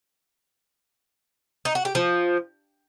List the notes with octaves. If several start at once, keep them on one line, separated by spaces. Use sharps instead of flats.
D#4
F#4
G4
F3